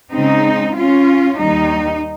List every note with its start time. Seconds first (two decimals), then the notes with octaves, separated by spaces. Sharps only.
0.12 C#3 G#3 C4 D#4
0.76 C#4 F4
1.40 D#2 D#3 G3 D#4